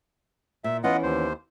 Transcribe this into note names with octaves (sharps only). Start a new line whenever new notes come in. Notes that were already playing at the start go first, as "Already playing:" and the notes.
A#2 E5
E3 B3 C#4 F4 D#5 F#5
D#2 C5